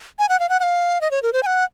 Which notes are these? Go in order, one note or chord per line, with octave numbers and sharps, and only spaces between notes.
G#5
F#5
F5
F#5
F#5
F5
D#5
C#5
A#4
C5
G#5
F#5